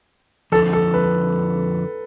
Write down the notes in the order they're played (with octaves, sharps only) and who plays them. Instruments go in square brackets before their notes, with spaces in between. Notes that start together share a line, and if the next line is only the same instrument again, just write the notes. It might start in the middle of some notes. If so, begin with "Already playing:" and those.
[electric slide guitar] F3 [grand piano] A4
[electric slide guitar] F2 D3
[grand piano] A4
B4